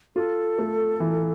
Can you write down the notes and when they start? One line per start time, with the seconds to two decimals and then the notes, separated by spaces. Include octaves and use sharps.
0.16 F4 A4
0.59 A3
1.00 E3